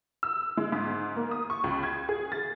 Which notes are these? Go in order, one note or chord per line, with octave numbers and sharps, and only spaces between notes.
E6
G#3
G#2
A#3
D#6
C#6
C#2
G#6
G#4
A6